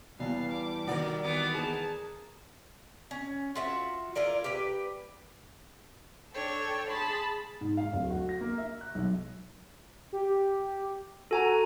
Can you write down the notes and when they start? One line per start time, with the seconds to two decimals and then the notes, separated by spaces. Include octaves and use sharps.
0.19 E2 E3 G3 F5 A5
0.51 D6
0.87 D#3 F#4 A#4 D5
1.24 D#3 E3 B3 D6
1.54 G#4 A#4 A5
3.11 C#4
3.55 F4 F#4 E5
4.15 E4 F4 A#4 D5
4.44 G4 B4
6.34 D4 A4 C#5 G5
6.88 G#4 A5 B5 C6
7.61 G#2
7.77 F5
7.93 D1
8.10 F#4
8.29 A#6
8.41 A#3
8.58 E5
8.81 F#6
8.95 B1
10.13 G4
11.31 F#4 A4 G#5 A#5